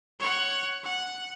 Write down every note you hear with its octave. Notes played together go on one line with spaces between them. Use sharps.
C#5 F#5
F#5